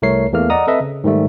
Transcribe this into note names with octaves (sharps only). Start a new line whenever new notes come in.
C2 A3 A#4 C#5 C7
E2 E3 A3 A#3 F6
D5 D#5 F#5 A#5 D#6
C4 A4 B4 D#5 E5
C#3
G#2 D#3 G3 A3